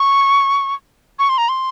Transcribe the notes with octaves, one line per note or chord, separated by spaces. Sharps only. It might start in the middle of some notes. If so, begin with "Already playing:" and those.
Already playing: C#6
C#6
C6
A#5
C6